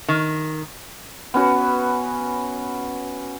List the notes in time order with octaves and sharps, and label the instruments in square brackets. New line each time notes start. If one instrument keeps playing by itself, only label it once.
[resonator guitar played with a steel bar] D#3
[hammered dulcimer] B3 C#4 F#4 B4